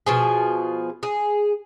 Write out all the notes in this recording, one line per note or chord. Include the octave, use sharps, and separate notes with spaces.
B2 F3 G#4
G#4